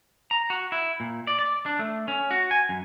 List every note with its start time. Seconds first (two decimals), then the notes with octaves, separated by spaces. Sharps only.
0.31 A#5
0.50 F#4
0.72 E4
1.00 A#2
1.27 D5
1.39 D5
1.66 D4
1.79 A3
2.08 C#4
2.31 F#4
2.51 G#5
2.69 F#2